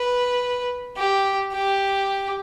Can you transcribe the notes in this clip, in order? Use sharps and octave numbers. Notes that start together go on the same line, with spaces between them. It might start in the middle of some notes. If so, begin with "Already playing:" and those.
Already playing: B4
G4
G4